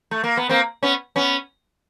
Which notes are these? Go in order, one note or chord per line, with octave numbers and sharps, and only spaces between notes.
A3
A#3
B3
A#3 C4
B3 C#4
B3 C#4